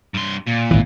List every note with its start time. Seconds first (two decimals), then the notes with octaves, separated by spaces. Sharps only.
0.14 G2 C6
0.47 A#2
0.71 G#1 E3